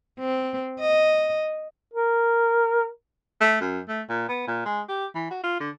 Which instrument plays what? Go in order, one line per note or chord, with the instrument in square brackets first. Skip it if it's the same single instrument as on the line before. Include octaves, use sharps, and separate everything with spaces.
[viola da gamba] C4
D#5
[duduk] A#4
[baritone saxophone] A3
F#2
A3
A#2
B3
A#2
G#3
G4
E3
F#4
F4
D3